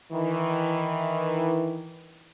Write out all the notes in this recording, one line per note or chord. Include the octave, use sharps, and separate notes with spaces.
D#3 E3